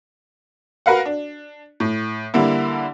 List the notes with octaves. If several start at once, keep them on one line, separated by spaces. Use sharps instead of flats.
F#4 A#4 B4 F5 F#5
D4
A2
D3 G3 A#3 E4